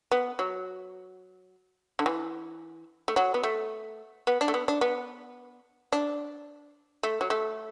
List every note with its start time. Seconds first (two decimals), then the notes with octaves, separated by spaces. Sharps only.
0.11 B3
0.39 F#3
1.99 D3
2.06 E3
3.08 A3
3.16 F#3
3.34 B3
3.43 A3
4.27 B3
4.41 D4
4.48 A3
4.54 B3
4.68 D4
4.81 B3
5.92 D4
7.03 A3
7.21 F#3
7.30 A3